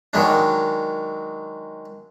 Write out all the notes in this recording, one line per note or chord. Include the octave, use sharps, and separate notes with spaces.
D#3 F#3 G#3 D4